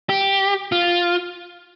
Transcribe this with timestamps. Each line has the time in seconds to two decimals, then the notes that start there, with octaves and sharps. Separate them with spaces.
0.09 G4
0.72 F4